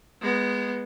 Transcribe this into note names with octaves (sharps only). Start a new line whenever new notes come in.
G#3 B3